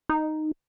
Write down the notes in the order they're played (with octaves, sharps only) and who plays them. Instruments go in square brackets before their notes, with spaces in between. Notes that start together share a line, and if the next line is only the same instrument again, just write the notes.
[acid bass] D#4